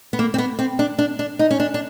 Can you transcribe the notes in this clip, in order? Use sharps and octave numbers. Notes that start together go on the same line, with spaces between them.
B3
A#3
C4
B3
C4
D4
D4
D4
D#4
C#4
D4
D4